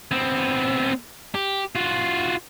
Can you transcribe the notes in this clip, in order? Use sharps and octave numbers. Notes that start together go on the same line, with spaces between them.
B3 C4
G4
F4 F#4